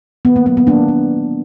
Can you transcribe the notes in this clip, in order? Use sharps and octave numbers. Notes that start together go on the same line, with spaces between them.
D#3 B3
A#3
F#3 B3
B3
D#3 A#3 D4
A#3